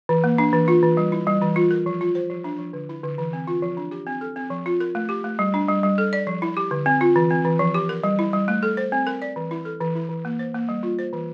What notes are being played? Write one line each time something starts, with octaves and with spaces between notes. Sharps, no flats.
E3
A#3
D4
E3
F4
E3
G3
E4
G3
E3
F4
A#4
F3
F4
C5
F3
D4
F3
D3
E4
D3
E3
C4
F4
F3
D4
G4
C4
A4
C4
F3
F4
A#4
A3
G4
A3
G3
D4
G3
G3
A4
D5
F3
E4
G4
D3
C4
F4
E3
C4
E3
F3
G4
A#4
G3
E4
G3
A3
A4
C5
C4
A#4
D5
E3
E4
A4
E3
E4
E3
A#3
C5
A#3
G3
F4
C5
E3